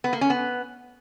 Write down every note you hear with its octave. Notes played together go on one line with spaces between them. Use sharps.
B3
A#3
C#4
B3